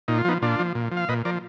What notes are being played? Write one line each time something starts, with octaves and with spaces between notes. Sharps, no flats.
A#2 D#4
F4
F3 B3 D#4
A#2 D4 F4
F3
A#2
F3
F5
A#2 B4 D#5
F3 A#4 D5